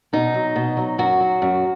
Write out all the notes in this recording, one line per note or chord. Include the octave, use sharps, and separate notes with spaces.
B2 D#4
F#3
B2
F#3
F#2 F#4
F#3
F#2